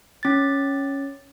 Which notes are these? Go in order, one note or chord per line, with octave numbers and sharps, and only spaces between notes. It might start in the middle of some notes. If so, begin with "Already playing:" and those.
C#4 A6